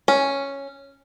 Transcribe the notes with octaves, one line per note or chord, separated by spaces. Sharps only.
C#4